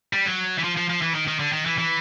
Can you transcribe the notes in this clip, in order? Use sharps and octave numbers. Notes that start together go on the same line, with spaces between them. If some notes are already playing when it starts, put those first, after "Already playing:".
G3
F#3
E3
F3
F3
F3
E3
D#3
D#3
D3
D#3
E3
E3